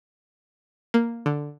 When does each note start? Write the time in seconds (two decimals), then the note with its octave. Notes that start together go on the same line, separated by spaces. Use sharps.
0.94 A#3
1.26 D3